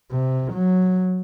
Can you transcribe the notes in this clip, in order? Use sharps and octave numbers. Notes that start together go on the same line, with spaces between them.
C3
F#3